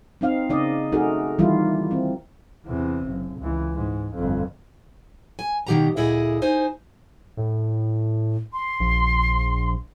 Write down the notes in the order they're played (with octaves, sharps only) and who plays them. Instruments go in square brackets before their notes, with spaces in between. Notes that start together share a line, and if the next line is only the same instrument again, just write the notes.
[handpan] C4 D#4 F5
C#3 A#3 D#4 D5 D#5
A3 D#4 F#4 G#4 A#4
D#3 E3 G3 A#3 E4 F4
C4
[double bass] E2 C3
F#1
C#2 E3
G#2
G1 F2
[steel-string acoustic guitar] G#5
B2 D#3 A#3 G4 F#5 A#5
D2 A#2 E4 G#4 D#5 F#5
D#4 C5 G#5
[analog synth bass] A2
[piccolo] C6
[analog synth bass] A#1